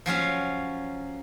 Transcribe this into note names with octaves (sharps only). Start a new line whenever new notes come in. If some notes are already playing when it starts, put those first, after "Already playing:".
F3 F#3 C#4 F5